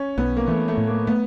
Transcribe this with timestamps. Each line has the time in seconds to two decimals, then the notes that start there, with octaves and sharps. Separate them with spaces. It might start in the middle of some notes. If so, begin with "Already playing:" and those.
Already playing: C#4
0.18 B1 B3
0.37 A#3
0.48 E3 A3
0.68 A3
0.78 A2
0.88 A#3
1.07 A3 B3